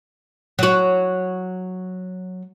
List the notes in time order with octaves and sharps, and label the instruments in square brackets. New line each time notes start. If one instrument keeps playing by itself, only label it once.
[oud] F#3 F#4